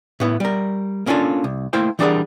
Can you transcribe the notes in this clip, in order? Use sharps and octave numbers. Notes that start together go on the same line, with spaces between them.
A2 B3 E4
G3 A#4
A#3 C#4 D4 F4 A4
C2
A3 A#3 E4 C5 F5 G5
E3 G3 D4 G#4 A#4 F#5